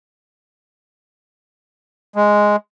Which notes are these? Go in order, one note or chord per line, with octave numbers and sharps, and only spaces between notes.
G#3